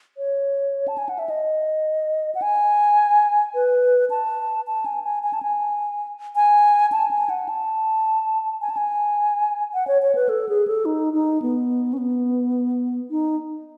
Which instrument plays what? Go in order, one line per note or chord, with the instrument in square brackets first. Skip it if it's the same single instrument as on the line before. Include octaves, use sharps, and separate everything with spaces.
[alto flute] C#5
A5
G#5
F#5
E5
D#5
F#5
G#5
B4
A5
A5
G#5
G#5
G#5
A5
G#5
G#5
A5
G#5
F#5
A5
G#5
A5
G#5
F#5
C#5
C#5
B4
A4
G#4
A4
D#4
D#4
B3
C#4
B3
D#4